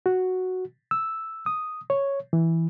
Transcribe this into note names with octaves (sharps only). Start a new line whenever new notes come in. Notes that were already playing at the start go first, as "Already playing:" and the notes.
F#4
E6
D#6
C#5
E3